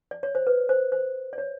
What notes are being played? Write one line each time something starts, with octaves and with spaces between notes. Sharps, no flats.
D5
C#5
C5
B4
C5
C5
D5
C#5